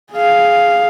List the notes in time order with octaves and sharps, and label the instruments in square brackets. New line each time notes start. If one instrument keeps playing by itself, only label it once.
[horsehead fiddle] G#4 F5